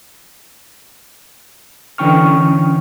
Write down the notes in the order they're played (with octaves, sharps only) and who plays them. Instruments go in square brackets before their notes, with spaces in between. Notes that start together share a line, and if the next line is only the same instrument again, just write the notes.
[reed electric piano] D3 E3 C#4 G5 C#6 F6